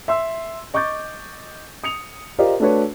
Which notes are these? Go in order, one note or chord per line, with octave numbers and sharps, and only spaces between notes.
E5 C6 E6
D#5 C#6 D6 G6 A6
D#6 C#7 F7
F4 G4 A#4 C5 D5 D#5
A3 D4 F#4 A4 B4 C#5